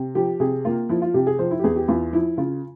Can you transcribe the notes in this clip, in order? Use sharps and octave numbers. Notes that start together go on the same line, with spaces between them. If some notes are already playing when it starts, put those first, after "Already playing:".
Already playing: C3
F3 G4
C3 G#4
A#3 F4
F3 E4
F4
C3 G4
G#4
F3 C5
E4
G4
E2 G#4
G4
E2 F4
F3 E4
C#3 F4